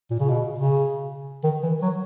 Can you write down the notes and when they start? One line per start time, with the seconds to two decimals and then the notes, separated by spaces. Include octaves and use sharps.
0.10 A#2
0.20 C#3
0.29 B2
0.58 C#3
1.44 D#3
1.63 E3
1.82 F#3